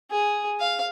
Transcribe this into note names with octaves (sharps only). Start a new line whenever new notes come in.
G#4
F5